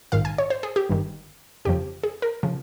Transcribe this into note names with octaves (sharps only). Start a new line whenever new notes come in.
A#1 G#2 D#3 F5
G#5
C#5
C5
G#4
G4
G1 G2 D#3
G1 F2 C#3 F3 G4
G#4
A#4
C#3 F3